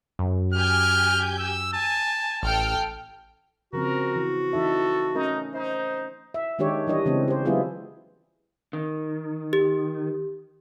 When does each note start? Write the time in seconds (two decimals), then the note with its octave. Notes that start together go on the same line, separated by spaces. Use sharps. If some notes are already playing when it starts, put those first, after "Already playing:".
0.19 F#2
0.54 G4 G#5 F6 G6
1.39 E6
1.73 G#5 A5
2.43 A1 A4 G5 F6
3.73 C#3 F3 C4 F#4 A#4
4.16 E3
4.53 E3 D#4 A4 E5
5.15 A3 C#4 D#4 A#4
5.54 D#4 C5
6.34 E5
6.59 D#3 G#3 D4 G4 C#5
6.87 E3 G3 D4 C#5 D#5
7.06 C#3 E3 G#3 C4 D4
7.28 G4 C5
7.45 F#3 G#3 B3 E4 F4 G#4
8.73 D#3
9.53 G4